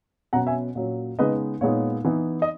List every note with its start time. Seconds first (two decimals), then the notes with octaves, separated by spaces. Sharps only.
0.33 B2 F#3 C#4 F#5 A#5
0.47 E5 G#5
0.75 A#2 F#3 C#4
1.19 C#3 G#3 B3 D#4 B4 D#5
1.61 A#2 G#3 B3 D#4 C#5
2.05 E3 B3 D#4
2.42 D#5